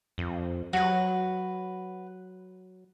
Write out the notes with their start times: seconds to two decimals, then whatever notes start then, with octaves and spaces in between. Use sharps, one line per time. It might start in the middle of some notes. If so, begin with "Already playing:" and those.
0.18 F2
0.73 F#3 F#4 B4